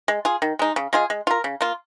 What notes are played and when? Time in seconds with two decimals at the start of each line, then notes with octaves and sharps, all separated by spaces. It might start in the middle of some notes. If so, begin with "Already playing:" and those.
0.08 G#3
0.25 F4 G#4
0.42 D#3
0.59 G#3 D#4
0.76 C#3
0.93 G#3 F4 G#4
1.10 G#3
1.27 F4 A#4
1.44 C#3
1.61 A#3 F4